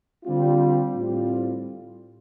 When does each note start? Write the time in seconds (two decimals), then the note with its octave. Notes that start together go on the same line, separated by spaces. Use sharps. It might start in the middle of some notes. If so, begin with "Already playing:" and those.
0.24 D3 G3 C4 F4
0.95 A2 G3 C4 F4